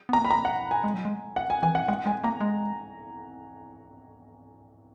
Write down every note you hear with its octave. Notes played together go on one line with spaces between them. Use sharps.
B3
A#5
A#3
B5
A#5
F#5
G#5
G#3
F#3
G#3
F#5
G#5
E3 G#5
F#5
G#3 F#5
G#3 G#5
A#3 A#5
G#3